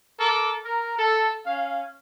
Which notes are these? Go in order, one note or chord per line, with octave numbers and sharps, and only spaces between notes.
A4 A#4 D6
A#4
A4
C#4 F5